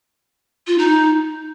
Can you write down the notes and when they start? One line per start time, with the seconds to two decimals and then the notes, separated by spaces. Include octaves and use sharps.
0.67 F4
0.78 D#4